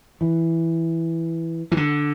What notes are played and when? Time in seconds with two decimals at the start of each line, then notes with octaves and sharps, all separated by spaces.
0.21 E3
1.72 E3
1.77 D3